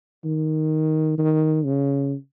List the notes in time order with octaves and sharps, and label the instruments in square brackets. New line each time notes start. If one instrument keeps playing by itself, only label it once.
[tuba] D#3
D#3
C#3